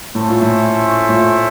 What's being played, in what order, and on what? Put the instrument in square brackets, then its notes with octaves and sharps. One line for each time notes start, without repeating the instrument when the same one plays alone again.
[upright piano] A2 [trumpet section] A3 C#4 E4 A4 C5
[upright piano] A#2
A2
A2
A#2